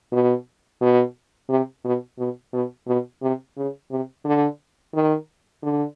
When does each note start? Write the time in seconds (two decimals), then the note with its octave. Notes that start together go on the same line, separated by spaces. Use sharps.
0.12 B2
0.81 B2
1.50 C3
1.85 B2
2.18 B2
2.53 B2
2.87 B2
3.22 C3
3.57 C#3
3.91 C3
4.25 D3
4.94 D#3
5.63 D3